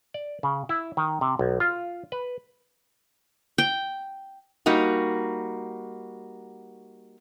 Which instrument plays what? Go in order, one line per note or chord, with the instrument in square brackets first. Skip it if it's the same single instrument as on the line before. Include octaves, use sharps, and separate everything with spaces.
[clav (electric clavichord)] D5
C#3
E4
D#3
C3
B1
F4
B4
[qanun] G5
[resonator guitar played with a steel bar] G3 A#3 D#4 F#4